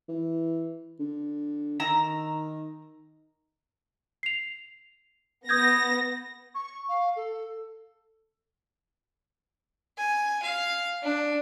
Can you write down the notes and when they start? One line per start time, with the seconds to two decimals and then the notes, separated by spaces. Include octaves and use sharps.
0.08 E3
0.99 D3
1.80 D#3 A#5 E6
4.23 C7 F7
5.49 B3 D#6 G6 G#6 A#6
6.55 C#6
6.89 F5
7.16 A4
9.97 G#5
10.43 F5
11.03 D4